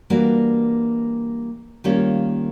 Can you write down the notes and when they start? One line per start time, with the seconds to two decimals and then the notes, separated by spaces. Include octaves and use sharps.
0.10 E3 G3 A#3 D4 F#4
1.84 D#3 G3 A#3 C#4 F4